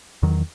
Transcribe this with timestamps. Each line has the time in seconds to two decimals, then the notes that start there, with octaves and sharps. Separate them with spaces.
0.23 E2 D#3 F#3